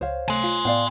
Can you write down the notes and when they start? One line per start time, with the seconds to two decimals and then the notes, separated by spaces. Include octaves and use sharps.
0.01 C#2 C5 C#5 F5
0.28 C3 A3 G#5 C6
0.44 F4
0.65 A2 B3 D5 F5 G5